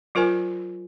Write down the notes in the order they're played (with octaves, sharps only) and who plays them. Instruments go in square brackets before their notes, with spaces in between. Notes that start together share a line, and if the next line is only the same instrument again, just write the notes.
[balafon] F#3 F4 A#4 C5 G#5